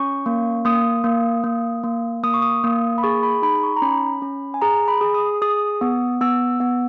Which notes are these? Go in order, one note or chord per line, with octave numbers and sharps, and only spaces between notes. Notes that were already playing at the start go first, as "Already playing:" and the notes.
Already playing: C#4 C#6
A#3
A#3 D#6
A#3
A#3
A#3
A#3 D#6
C#6
D#6
A#3
B5
G#4 C#6
B5
D#4 B5
B5
C#6
A#5
C#4 B5
C#4
G#5
G#4 A#5
B5
G#4
D#6
G#4 D#6
B3
B3 E6
B3